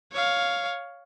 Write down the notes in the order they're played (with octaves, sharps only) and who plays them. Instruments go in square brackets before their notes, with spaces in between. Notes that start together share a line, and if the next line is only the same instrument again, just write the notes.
[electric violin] C#5 F5